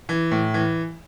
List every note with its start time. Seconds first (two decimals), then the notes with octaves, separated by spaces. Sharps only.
0.09 E3
0.31 A2
0.54 E3